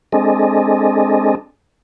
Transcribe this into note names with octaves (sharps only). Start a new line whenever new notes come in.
G#3 C4 D4 G#4 A4 D#5